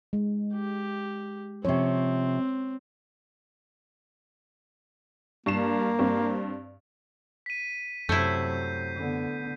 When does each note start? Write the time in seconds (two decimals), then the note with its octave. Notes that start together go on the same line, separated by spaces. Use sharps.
0.13 G#3
0.53 G4
1.65 C3 F3 C4 C#5
5.46 G2 A#3 C7 E7
5.99 G2 C4
7.46 B6 D#7
8.09 F#2 C3 F#3 A3 E4 G6 C7
8.96 D3 B3